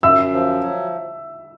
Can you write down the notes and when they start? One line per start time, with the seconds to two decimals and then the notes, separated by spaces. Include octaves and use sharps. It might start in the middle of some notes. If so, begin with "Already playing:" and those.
0.03 F#2 E5 E6
0.33 F3
0.62 F#3